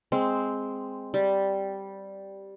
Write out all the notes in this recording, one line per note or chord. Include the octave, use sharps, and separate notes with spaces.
G#3 C4
G3